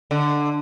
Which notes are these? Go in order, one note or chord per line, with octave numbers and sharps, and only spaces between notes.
D3